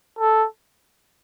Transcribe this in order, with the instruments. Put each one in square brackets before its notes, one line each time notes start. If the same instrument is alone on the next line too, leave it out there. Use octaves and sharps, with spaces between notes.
[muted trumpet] A4